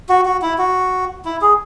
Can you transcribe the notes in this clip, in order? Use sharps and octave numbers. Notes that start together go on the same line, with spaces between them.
F#4
F#4
E4
F#4
E4
G#4